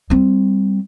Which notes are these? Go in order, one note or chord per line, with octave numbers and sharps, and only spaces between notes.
G3 C4